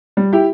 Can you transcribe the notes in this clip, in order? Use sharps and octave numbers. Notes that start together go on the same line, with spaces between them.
G3
E4 G4